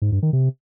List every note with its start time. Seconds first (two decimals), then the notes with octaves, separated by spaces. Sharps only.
0.02 G#2
0.12 G2
0.23 D#3
0.33 C3